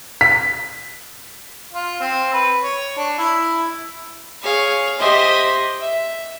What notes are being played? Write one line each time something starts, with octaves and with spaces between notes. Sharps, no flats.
B6
F4
C4
B4
C#5
D4
E4
G#4 C#5 F5
G4 C5 D#5 E5 C6
E5